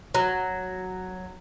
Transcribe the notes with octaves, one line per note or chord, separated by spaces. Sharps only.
F#3